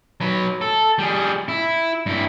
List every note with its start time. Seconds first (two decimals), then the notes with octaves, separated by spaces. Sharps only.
0.21 F#3 B4
0.61 A4
0.99 G3 G#4
1.48 E4
2.06 G2 E4